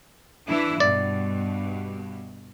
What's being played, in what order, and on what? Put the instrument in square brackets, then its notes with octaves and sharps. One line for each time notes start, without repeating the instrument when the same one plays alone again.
[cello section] E3 D4 E4
[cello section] G2 B2 [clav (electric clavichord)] D5